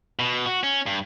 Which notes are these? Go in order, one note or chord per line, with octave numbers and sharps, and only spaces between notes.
B2
F#4
C#4
G2